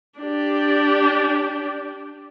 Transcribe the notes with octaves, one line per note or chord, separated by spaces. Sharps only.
D4 G4